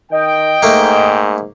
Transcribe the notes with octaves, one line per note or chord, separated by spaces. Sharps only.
D#3 D#5 G5
G#2 A3 A#3